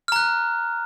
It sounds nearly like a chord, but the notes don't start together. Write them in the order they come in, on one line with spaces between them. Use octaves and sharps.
F6 A#5 F#6